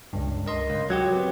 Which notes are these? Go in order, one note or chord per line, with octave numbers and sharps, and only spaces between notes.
C#2 G2
A#4 D#5 C6
C#2
F#3 F#4 G4 G#6
C4 B4